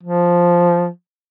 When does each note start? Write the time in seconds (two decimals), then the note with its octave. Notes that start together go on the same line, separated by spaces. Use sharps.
0.03 F3